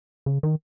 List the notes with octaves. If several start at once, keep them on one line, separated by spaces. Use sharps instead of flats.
C#3
D#3